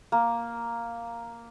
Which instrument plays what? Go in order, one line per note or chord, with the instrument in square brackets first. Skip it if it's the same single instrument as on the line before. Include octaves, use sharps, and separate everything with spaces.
[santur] A#3